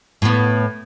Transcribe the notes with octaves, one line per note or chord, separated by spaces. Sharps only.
A2 B3